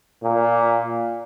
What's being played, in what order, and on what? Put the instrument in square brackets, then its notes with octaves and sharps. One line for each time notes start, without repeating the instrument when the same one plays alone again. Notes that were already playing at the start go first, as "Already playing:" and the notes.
[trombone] A#2